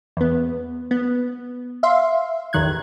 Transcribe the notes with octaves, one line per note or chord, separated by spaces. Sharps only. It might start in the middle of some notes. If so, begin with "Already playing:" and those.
E2 B3
B3
E5 F5 C6
A1 E2 D#3 F#6 G#6